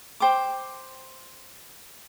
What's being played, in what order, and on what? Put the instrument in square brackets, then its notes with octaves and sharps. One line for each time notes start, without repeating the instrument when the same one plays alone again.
[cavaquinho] C5 G5 D6